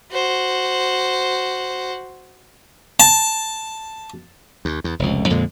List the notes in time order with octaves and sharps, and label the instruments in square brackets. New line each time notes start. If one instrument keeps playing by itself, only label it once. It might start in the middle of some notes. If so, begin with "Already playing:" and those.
[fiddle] F#4 C5
[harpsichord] A5
[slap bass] D#2
E2
F1 C#2
F2 A#2 D3 G#3